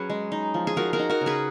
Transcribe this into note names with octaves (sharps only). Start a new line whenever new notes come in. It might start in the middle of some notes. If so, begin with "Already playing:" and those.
Already playing: F#3 C#4 G#4 B4
G#3
D#4
F3
G#4
F3 F#4 A#4
F#4 A#4
D#4
F#4 A#4
C#3
G#4 B4